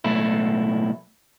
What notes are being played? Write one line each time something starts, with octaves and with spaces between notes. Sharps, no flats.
B1 A2 E4